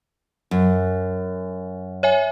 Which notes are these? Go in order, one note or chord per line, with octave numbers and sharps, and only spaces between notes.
F#2
C#5 E5 G#5